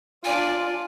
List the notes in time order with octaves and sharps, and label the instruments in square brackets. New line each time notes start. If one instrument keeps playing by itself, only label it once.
[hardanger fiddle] D4 D5 [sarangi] F4 [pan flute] G#5